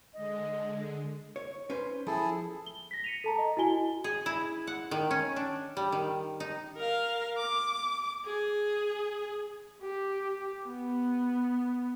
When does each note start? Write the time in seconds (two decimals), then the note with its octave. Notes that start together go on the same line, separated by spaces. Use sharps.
0.14 D3 G#3 D#5
1.36 C#5
1.70 C#4 B4 C5
2.07 F3 E4 G#4 A4
2.66 G7
2.91 A#6 B6
3.04 C#7 D#7 F7
3.24 A4 A5 A#5
3.39 D#5
3.57 E4 F#4 G#5 G7
4.04 G#4
4.26 E4
4.67 F#5
4.91 D#3
5.11 C#4
5.36 D4
5.77 G3
5.92 D#3
6.40 D#4
6.76 A#4 F5
7.37 D6
8.25 G#4
9.82 G4
10.67 B3